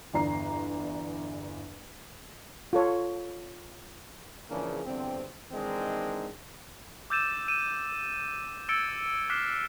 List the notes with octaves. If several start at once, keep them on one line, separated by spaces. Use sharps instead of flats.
G1 E2 G2 D5 A#5 C7
F4 A4 C#5
C#3 E3 F3 A#3 D4 G#4
E2 G2 D3 C4
D#3 E3 G#3 C4 D4 D#4
D6 E6 G6 A6 D#7 E7
E6 D#7 E7
E6 G#6 A6 C#7 D7 G7
D6 F6 F#6 B6 C7 E7